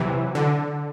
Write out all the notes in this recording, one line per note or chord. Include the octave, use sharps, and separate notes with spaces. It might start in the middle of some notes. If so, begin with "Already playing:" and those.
Already playing: C3 E3 F#3
D3